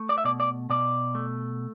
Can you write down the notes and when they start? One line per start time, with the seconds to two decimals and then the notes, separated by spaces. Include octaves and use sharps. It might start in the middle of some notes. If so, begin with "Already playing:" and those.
Already playing: A3
0.09 D5
0.18 E5
0.24 B2 D5
0.40 D5
0.70 B2 D5
1.15 A3